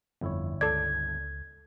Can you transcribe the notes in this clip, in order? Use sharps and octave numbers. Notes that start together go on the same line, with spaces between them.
G1 F2 E4 C#5
C#2 A4 D5 G#6